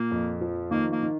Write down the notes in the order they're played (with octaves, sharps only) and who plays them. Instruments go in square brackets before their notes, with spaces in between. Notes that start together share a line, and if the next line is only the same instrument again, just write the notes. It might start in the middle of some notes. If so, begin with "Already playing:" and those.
Already playing: [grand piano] A#2 [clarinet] A#3
[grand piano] F2
F3
[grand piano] D#3 [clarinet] A#3
[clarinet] A#3
[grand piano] D#3